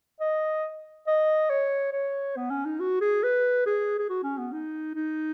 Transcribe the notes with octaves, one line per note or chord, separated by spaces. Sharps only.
D#5
D#5
C#5
C#5
B3
C#4
D#4
F#4
G#4
B4
G#4
G#4
F#4
C#4
B3
D#4
D#4